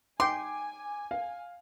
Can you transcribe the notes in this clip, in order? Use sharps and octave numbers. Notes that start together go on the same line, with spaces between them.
D#4 G5 G#5 C6 D6
F5